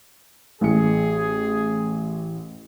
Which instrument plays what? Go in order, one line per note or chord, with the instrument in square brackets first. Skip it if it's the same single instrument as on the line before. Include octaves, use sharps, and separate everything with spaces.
[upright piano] A1 A2 C#7 [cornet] G#4